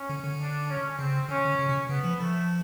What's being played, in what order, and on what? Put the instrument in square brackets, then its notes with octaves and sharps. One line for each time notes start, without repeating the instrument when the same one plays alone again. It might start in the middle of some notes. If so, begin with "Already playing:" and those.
Already playing: [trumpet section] C#4
[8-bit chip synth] D3
D3
[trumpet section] D4
C#4
[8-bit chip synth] C#3 [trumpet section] C4
[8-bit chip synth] D3 [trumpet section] C#4
[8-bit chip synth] D3
C#3
C3
[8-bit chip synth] C#3 [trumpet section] B3
[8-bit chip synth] F3
[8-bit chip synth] F3 [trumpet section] A3